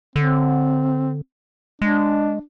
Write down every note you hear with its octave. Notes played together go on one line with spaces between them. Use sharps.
D3 C4
G#3 D4